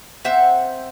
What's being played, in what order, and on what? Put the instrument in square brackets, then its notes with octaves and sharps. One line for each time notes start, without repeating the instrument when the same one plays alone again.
[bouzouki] C4 C5 E5 F#5